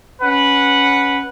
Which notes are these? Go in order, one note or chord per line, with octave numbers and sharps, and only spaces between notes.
C#4 B4 F#5